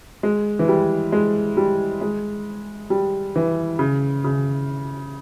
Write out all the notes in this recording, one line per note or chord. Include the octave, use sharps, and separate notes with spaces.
G#3
E3
G3
G#3
G3
G#3
G3
E3
C#3
C#3